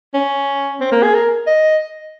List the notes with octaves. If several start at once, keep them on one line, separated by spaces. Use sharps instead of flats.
C#4
C4
A#3
G#4
A#4
D#5